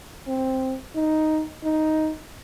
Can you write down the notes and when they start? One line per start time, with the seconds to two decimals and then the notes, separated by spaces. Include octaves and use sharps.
0.27 C4
0.95 D#4
1.64 D#4